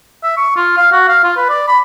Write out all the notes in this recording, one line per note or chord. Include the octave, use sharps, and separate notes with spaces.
E5
C#6
F4
F5
F#4
F5
F4
B4
D5
B5